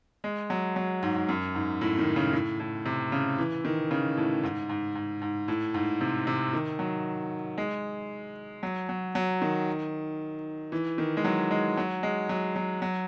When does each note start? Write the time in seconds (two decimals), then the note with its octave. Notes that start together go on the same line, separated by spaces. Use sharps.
0.24 G#3
0.50 F#3
0.76 F#3
1.03 G#2
1.16 G#2
1.29 F#2
1.55 G#2
1.81 A2
1.99 D#3
2.16 C#3
2.33 A2
2.60 A2
2.86 C3
3.12 C#3
3.38 E3
3.65 D#3
3.91 C#3
4.17 A2
4.43 G#2
4.69 G#2
4.96 G#2
5.22 G#2
5.48 A2
5.74 G#2
6.01 C3
6.27 C3
6.53 D#3
6.79 F#3
7.58 G#3
8.63 F#3
8.89 F#3
9.15 F#3
9.42 D#3
10.72 E3
10.98 D#3
11.17 G#3
11.25 F#3
11.51 G#3
11.77 F#3
12.03 G#3
12.29 F#3
12.56 F#3
12.82 F#3